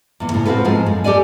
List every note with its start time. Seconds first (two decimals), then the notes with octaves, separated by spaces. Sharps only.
0.20 E2 A#2
0.32 A2 C#3
0.45 C4 F4 F#4 A4 B4
0.65 G#2 F3 G#3
0.86 F#2
1.04 G4 A4 D5 G#5